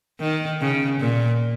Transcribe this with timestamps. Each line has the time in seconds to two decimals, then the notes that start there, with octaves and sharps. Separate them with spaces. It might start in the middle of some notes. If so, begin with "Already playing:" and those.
0.20 D#3
0.61 C#3
1.00 A#2